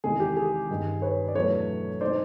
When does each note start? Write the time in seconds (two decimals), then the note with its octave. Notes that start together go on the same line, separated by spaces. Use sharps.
0.04 E2 C3 D#3 G#3 G#4
0.20 G4
0.37 G#4
0.69 G2 D#3 G3
1.02 B4 C#5
1.28 D5
1.35 E2 B2 F#3 A3 D4 B4 C#5
2.01 B2 G#3 C4 D#4 C5 D5